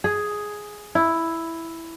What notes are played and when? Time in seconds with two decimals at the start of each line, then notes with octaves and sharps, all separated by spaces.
0.04 G#4
0.95 E4